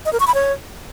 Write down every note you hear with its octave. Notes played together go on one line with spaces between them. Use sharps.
D#5
A#4
C#6
B5
C#5